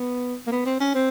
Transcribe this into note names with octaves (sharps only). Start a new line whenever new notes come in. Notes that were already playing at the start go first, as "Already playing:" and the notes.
Already playing: B3
A#3
B3
C4
C#4
C4